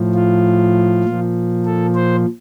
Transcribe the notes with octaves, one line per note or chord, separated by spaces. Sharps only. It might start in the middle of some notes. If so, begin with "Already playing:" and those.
Already playing: A2 F3
F4
A#2 F3
A4
C5